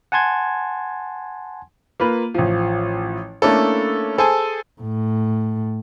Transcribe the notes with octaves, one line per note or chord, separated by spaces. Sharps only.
F#5 G#5 A5 C6 G#6
A#3 F4 B4
A1 F3
A3 A#3 C#4 D4 E4 A4
G#4 A4 C5 G#5 A5
A2